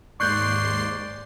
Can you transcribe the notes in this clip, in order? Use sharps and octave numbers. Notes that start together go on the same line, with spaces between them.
D#2 G#2 D5 C6 C#6 F#6 G6 C7